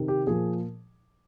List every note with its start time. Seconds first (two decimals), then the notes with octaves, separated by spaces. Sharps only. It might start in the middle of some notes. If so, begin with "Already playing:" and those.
Already playing: C3 D#3
0.08 G4
0.27 A#2 F3 G#4